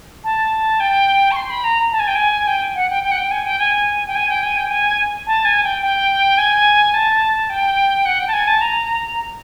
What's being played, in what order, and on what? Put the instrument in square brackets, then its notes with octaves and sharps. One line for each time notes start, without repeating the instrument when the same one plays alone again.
[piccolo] A5
G5
C#6
C6
B5
A#5
A5
G#5
G5
G#5
G5
F#5
G5
G5
F#5
G5
G#5
G5
G#5
G5
G#5
G5
G#5
G5
G#5
A5
G#5
G5
G5
G#5
A5
G5
F#5
G5
A5
G#5
A5
A#5